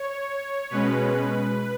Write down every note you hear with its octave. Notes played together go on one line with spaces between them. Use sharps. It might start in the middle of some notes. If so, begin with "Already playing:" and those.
Already playing: C#5
B2 G#3 C#4 B4